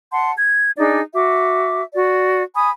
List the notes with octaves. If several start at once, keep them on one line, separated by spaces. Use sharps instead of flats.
F#5 A5 C6
G#6
D4 D#4 G#4 D5
F#4 E5 D6
F#4 D5
G#5 B5 D#6